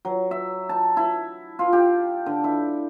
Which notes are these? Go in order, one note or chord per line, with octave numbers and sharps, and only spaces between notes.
F#3
E5
A5
E4
F4
G4
D3
E4